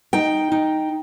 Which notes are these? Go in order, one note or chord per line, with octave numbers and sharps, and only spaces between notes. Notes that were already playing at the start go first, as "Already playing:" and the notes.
D#4 G5
D#4